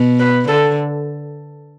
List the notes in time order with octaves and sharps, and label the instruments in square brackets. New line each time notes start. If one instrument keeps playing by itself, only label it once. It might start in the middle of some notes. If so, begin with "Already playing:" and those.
Already playing: [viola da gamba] B2
[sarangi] B4
[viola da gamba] D3 [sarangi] A4